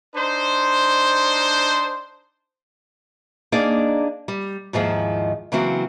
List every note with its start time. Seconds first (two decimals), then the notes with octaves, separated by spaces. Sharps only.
0.16 D4 D#4 C5
3.52 A#3 D4 D#4 G#4 D5
4.28 G3
4.73 D#2 G#2 D#3 F3 E4 G#4
5.52 C#3 E3 F#3 A#3 C4 F#4